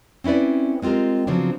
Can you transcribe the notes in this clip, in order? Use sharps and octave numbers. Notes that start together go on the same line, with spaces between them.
C4 C#4 E4 B4 D5
G#3 C4 F4 G4 A#4
C#3 F3 F#3 B3 C4 D4